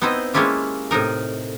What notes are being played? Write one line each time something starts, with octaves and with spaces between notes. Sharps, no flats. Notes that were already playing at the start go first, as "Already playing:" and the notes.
B3 C4 D#4 E4 C5 D#5
G#3 A#3 C#4 E4 F4 G4
A2 C3 D#4 A#4